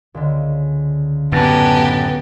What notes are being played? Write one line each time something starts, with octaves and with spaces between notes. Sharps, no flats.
C#2 D3
F#2 A2 B3 D4 G4